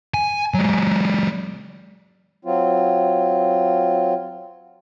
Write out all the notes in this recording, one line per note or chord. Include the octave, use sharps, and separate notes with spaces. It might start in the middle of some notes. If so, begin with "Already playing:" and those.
G#5
F#3 G#3
F#3 C4 F4